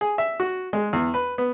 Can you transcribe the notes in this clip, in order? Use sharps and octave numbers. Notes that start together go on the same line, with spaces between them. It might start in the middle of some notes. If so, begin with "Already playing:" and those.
G#4
E5
F#4
G#3
E2
B4
B3